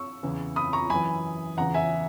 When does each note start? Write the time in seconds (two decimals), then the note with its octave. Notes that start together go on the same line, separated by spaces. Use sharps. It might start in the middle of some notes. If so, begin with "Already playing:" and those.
Already playing: C#6 E6
0.23 E2 C#3 E3
0.56 B5 D#6
0.73 A#5 C#6
0.90 F#2 E3 G#5 B5
1.57 E2 C#3 E3 F#5 A#5
1.74 E5 G#5